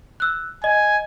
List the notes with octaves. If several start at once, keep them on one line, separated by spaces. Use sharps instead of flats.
E6 F#6
D#5 G#5